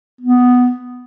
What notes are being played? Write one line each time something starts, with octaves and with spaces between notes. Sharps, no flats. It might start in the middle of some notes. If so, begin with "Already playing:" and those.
B3